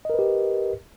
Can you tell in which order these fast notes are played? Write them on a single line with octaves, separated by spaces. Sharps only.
D#5 A#4 B4 G4